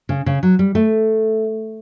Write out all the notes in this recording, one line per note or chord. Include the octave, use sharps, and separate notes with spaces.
C#3
C#3
F#3
G3
A3